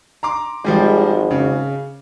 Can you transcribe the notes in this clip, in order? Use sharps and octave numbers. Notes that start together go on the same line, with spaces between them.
A#5 C6 D6
G#1 F3 G3 G#3
C#3